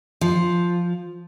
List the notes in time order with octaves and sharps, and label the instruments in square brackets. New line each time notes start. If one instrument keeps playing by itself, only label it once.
[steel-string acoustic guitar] F3